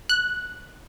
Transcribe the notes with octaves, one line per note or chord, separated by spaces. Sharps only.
F#6